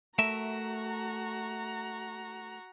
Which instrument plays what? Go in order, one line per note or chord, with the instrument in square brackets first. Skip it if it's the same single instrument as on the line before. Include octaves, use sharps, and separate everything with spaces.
[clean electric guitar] A3 A#4 E5 [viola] F#4 A#5